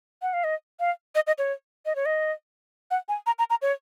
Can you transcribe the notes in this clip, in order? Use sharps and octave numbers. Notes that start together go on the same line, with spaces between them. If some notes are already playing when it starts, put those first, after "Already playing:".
F#5
F5
D#5
F5
D#5
D#5
C#5
D#5
C#5
D#5
F#5
G#5
A#5
A#5
A#5
C#5